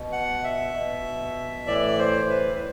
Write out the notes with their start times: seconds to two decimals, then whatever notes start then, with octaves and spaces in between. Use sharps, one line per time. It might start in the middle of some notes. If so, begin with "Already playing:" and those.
Already playing: B2
0.12 F#5
0.44 E5
0.75 B2
1.67 A2 E3 D5
1.99 C5
2.29 B4
2.55 B4